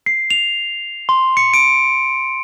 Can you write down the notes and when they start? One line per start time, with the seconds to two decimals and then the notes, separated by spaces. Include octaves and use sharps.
0.06 C7
0.30 F7
1.09 C6
1.37 C#7
1.54 D7